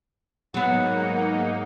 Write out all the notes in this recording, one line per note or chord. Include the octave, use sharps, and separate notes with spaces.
G#2 F#3 A#3 B3 D#4 F#5